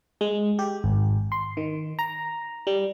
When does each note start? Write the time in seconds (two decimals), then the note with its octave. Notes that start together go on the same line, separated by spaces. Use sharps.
0.21 G#3
0.59 G4
0.84 G#1
1.32 C6
1.57 D#3
1.99 A#5
2.67 G3